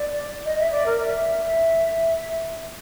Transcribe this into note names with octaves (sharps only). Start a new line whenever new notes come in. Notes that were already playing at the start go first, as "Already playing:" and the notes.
Already playing: D5
D#5
E5
D5
A#4
E5